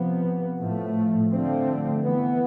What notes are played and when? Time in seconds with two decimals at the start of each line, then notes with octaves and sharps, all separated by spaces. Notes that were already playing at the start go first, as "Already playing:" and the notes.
Already playing: C3 F3 B3
0.59 A2 F3 A3
1.32 D3 F3 A3 C4
2.05 E3 B3